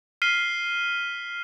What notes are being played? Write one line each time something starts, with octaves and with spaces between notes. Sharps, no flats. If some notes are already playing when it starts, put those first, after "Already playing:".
F6 B6 C7 D#7 G7